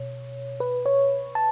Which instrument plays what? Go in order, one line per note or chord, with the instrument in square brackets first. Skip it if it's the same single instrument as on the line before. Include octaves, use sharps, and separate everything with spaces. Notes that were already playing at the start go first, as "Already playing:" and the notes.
Already playing: [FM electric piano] B2 C#5
B4
C#5
A5